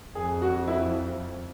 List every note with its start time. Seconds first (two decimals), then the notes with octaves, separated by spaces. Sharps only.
0.15 F2 G#4
0.42 F#4
0.68 E4